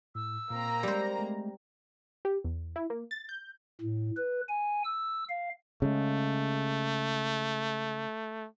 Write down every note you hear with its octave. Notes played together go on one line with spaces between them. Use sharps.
A2 E6
A#2 A#3 C4 A#5
G3 G#3 G4 C5
G#3 A3
G4
E2
E4
A#3
A6
G6
A2
B4
G#5
E6
F5
C#3 G#3 A3